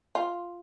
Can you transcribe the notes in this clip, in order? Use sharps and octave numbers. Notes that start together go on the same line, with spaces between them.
F4